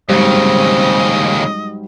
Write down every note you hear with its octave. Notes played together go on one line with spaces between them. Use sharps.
D#2 G#2 C#3 F#3 G3 C4 D#5